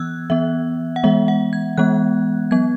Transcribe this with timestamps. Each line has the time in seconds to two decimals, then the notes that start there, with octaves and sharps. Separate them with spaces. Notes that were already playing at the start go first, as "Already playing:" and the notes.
Already playing: E3 B3 E6 F#6 G#6
0.30 E3 B3 E5
0.96 F#5
1.04 E3 G#3 B3 E5
1.28 F#5
1.53 G#6
1.78 E3 G#3 B3 F#6
2.51 F#3 B3 G#6